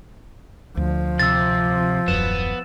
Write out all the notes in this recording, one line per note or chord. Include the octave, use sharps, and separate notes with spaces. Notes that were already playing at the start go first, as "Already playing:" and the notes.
D2 F3
C3 E6 A6
D#1 F#2 B3 E7